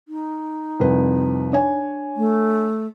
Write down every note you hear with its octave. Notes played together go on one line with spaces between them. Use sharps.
D#4
C2 F2 B4
D4 C#5 G#5
A3